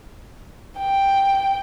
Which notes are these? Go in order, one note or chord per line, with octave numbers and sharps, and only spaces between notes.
G5